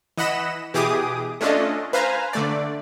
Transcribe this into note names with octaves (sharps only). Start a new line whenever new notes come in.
E3 D#5 F#5 B5 E7
B2 E3 G4 G#4 D6 D#6
A3 C#4 D4 F4 A4 D#5
B4 C5 F5 G#5 A#5
D3 A3 D5